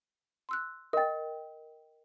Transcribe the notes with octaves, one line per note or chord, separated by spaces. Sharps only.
C6 E6 F#6
A#4 D#5 G5 A6